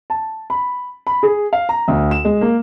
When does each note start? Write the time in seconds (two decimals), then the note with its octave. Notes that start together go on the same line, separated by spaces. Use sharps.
0.10 A5
0.50 B5
1.07 B5
1.23 G#4
1.53 F5
1.69 A#5
1.88 D2
2.11 E7
2.25 G#3
2.41 A#3